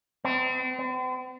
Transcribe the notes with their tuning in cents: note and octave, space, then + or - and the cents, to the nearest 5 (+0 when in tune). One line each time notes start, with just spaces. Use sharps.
C4 -40
C4 -45